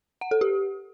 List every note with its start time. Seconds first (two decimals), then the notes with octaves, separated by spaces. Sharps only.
0.21 F#5
0.31 A4
0.41 G4